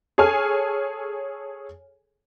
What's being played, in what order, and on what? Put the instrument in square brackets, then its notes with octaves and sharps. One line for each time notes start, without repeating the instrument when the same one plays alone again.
[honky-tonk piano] G#4 A4 C#5 G#5 F6